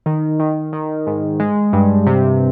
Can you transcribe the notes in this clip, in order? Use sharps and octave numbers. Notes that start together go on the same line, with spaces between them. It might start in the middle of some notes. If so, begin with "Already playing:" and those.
D#3
D#3
D#3
G#2
G#3
G2
C3